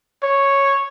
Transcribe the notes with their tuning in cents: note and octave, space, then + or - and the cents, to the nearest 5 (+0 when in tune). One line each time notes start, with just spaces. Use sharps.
C#5 -5